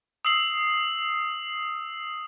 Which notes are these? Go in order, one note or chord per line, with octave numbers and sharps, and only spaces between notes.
D#6 E6 C7 F#7